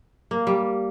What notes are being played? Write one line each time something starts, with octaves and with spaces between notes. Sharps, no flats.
A#3
G3